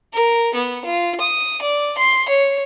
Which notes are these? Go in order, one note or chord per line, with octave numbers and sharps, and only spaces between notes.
A#4
B3
F4
D#6
D5
C6
C#5